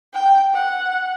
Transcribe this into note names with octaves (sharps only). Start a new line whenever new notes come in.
G5
F#5